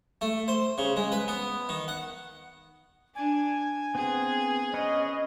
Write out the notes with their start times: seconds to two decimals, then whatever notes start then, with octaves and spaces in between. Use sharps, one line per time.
0.21 A3
0.48 C5
0.78 C#3
0.96 G#3
1.12 B4
1.28 B3
1.69 D#3
1.88 F#5
3.15 D4 G#5
3.95 B3 C4 G#4
4.74 C#4 B4 C#5 D#5